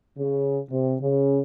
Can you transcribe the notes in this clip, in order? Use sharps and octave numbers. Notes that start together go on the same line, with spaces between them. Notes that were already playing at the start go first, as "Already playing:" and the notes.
C#3
C3
C#3